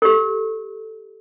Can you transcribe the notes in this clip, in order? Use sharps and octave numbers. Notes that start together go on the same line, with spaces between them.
G4 A4